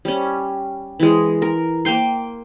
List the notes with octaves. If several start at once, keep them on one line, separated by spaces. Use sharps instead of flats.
G3 C#4
E3 G#3
A#4
A#3 F5 G5 C6